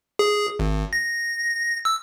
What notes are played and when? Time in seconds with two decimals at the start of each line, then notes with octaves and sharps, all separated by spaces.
0.19 G#4
0.59 G#1
0.93 A#6
1.85 E6